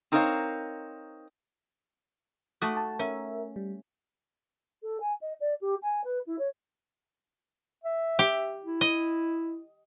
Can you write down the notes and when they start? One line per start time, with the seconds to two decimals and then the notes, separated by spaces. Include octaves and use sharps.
0.12 C4 D#4 A#4 C5 C#5 F5
2.61 A3 F#4 A5 D6 D#6
2.77 A5
2.99 C#4 A#4 E5
3.56 G3
4.82 A4
5.00 G#5
5.21 D#5
5.40 D5
5.61 G4
5.82 G#5
6.04 B4
6.26 E4
6.38 C#5
7.84 E5
8.19 G4
8.65 E4
8.81 D#5